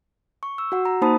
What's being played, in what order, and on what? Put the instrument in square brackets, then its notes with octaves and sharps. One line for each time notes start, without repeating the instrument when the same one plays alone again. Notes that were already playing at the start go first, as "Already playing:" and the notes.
[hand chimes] C#6
E6
F#4 F#5
A#5
A#3 D#4 C5 A5 B5 D#6